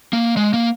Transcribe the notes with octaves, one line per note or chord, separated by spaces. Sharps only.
A#3
G#3
A#3